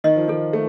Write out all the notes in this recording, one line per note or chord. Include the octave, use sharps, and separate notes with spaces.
D#3 D#5
F3
D#3 A4
A3